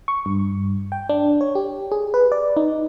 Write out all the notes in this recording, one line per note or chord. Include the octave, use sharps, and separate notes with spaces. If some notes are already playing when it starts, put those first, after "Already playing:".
C#6
G2
G5
D4
C#5
G4
G#4
B4
D5
D#4